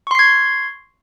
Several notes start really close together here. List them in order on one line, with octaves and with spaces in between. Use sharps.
C#6 C6 C7 G#6